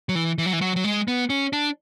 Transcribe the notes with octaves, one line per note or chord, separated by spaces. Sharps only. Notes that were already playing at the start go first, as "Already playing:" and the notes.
F#3
E3
E3
F#3
E3
F#3
F#3
G#3
B3
C#4
D4